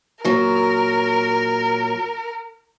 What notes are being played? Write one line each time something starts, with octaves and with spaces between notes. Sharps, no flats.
A#2 F#3 A#4